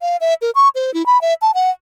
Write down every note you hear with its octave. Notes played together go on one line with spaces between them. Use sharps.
F5
E5
A#4
C#6
C5
E4
B5
E5
A5
F#5